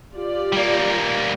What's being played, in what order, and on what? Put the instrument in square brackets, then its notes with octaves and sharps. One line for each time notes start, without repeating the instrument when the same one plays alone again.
[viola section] F4 G4 D5
[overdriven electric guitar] G3 A#3